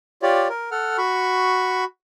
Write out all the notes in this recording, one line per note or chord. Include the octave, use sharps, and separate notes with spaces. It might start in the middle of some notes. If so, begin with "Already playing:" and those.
F4 G4 C#5 D5
A#4
A4 F#5 F6
F#4 B5 C#6